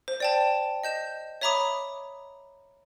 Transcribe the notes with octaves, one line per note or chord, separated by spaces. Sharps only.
C5
D5 G5 A5
D#5 G6 E7
C#5 E5 A#5 B5 D6 D#6